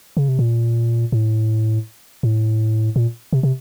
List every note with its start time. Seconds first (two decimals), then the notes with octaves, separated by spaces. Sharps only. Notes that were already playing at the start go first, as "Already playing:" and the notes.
0.17 C#3
0.28 C3
0.39 A#2
1.12 A2
2.23 A2
2.96 A#2
3.33 C3
3.43 C3